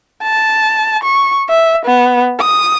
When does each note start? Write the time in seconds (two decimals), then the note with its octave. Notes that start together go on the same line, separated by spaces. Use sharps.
0.23 A5
1.03 C#6
1.49 E5
1.86 B3
2.40 D#6